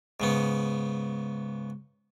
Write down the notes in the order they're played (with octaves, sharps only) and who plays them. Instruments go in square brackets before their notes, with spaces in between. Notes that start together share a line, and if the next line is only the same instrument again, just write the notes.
[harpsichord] G#2 C#3 B3